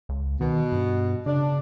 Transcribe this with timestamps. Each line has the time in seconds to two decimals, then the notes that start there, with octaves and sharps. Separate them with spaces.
0.09 C#2
0.41 B2 D#3
0.72 G2
1.26 C#3 D4